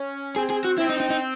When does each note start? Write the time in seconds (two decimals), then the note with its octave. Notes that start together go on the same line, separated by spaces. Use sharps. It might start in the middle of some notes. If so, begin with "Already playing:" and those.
Already playing: C#4
0.36 C4 G#4
0.50 G#4
0.65 F#4
0.78 C4 E4
0.89 D#4
1.00 D#4
1.10 D#4